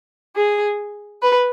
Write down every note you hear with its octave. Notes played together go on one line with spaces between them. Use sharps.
G#4
B4